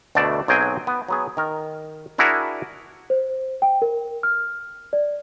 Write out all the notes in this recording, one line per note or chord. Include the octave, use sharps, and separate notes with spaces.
D2 B2 A3 D5 A5
B1 F#3 C4 G#4 G5 G#5
B3
F#3 B3 G#4
D#3 A#4
D4 E4 F#4 G#4 A#4 F#5
C5
G5
A#4
F6
D5